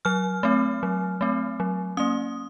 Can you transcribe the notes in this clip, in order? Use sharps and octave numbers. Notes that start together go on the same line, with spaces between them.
F#3 F6
A3 C4
F#3
A3 C4
F#3
A#3 C#4 D#6